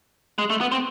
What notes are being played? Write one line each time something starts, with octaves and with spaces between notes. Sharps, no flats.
G#3
A3
B3
C4